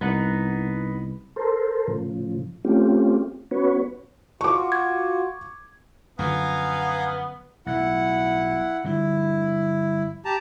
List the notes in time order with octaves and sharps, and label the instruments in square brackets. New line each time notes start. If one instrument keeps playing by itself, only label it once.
[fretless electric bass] C2 [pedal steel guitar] B3 D#4 F#5
[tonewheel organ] A4 A#4 C5
A2 C#3 F3
A3 C4 C#4 F4 G4
B3 C#4 F#4 B4 C#5
[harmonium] F4 F#4 [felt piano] C#6 D6
[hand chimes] G#6
[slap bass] F#2 D3 F3 [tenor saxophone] B3 [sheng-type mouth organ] F5 G#5 A#5
[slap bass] B1 A2 [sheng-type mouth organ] E4 F#5
[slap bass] G2 D3 F3 [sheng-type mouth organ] E4
[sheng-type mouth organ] G4 A5 A#5